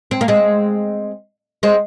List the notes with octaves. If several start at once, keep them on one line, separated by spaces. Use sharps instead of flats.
C4
A#3
G#3 C4
G#3 C4